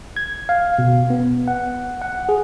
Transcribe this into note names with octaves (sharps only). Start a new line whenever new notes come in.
G#6
F5
B2
B3
F#5
F#5
G#4